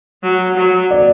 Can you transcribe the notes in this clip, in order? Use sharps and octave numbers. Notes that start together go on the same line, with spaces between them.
F#3
F#3
D5